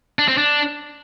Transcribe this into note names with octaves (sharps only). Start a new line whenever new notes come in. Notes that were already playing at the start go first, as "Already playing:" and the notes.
D4
C4
D4